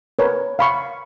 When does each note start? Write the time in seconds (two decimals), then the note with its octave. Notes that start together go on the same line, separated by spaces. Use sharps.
0.19 A#4 B4 C#5
0.59 F5 B5 C#6